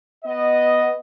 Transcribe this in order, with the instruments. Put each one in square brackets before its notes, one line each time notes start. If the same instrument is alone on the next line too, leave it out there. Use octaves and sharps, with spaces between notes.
[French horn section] B3 D#5